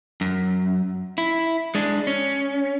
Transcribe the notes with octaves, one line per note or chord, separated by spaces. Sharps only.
F#2
E4
G#3 D4
C#4